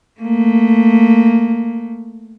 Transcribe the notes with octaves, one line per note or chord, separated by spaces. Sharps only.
A3 A#3